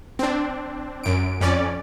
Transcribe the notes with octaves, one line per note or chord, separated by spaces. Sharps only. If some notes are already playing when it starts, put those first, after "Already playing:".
C4 D4
F#2 D7
F2 C#4 D5